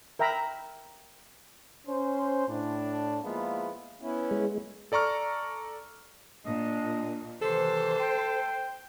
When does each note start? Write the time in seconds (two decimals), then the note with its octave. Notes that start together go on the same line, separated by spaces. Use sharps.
0.19 A#4 E5 G5 A#5 B5
1.87 C#4 C5
2.49 A2 D4
3.24 F3 G#3 A#3 B3 E4 F4
4.01 B3 C#4 E4
4.31 G#3
4.92 A4 D5 A#5 C#6 F6
6.45 A#2 D4 D#5
7.42 C3 D#3 E3 A4 C5
8.00 G5